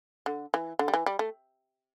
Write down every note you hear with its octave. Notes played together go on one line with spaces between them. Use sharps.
D3
E3
D3
G3
E3
G3
A3